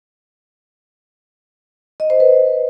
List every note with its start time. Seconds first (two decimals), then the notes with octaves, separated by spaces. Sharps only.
2.00 D#5
2.10 C5
2.20 B4